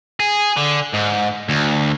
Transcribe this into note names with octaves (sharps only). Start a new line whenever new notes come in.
G#4
D3
G#2
D2